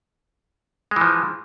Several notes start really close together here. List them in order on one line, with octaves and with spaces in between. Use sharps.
G#3 E3 F3